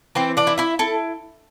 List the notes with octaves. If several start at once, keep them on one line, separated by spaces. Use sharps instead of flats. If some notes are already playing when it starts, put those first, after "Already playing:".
E3 C4 C5
D4 D5
E4
E4 E5
E4 A4